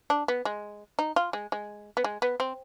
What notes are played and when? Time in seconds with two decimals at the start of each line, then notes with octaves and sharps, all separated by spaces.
0.10 D4
0.28 B3
0.45 G#3
0.99 D#4
1.16 F4
1.33 G#3
1.52 G#3
1.97 B3
2.04 G#3
2.22 B3
2.40 C4